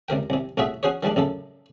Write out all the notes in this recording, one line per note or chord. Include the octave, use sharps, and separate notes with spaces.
C#2 C3 A#4 G5
C2 C3
C2 A2 F4 F#4 G#4 E5
C#4 F#4 G#4 C5 C#5
D#3 F3 G3 G#3 D4
A1 F#2 C#3 A4